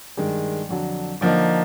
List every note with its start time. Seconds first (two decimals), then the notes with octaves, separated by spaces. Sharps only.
0.17 G2 D#3 G#3
0.69 F2 D3 F#3
1.21 D3 F3 A#3 D#4